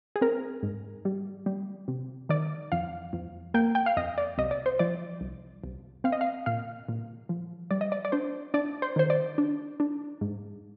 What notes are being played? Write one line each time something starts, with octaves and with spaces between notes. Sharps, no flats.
G#4
C4 A#4
G#2
G3
G3
C3
D#3 D5
F2 F5
F2
A#3 G5
G5
F5
F2 D#5
D5
C2 D#5
D5
C5
F3 D5
C2
C2
C4 F5
D#5
F5
A#2 F5
A#2
F3
G3 D5
D#5
D5
D5
D4 C5
D4 D5
C5
D#3 C5
D5
D4
D4
G#2